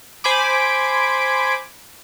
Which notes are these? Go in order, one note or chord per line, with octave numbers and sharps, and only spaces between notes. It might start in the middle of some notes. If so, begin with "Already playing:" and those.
C5 G#5 B5 D6